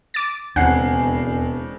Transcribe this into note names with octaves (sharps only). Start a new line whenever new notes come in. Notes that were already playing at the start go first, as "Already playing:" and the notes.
D6 A6
E1 D#2 C#3 C4 D4 F#5 G#5 C7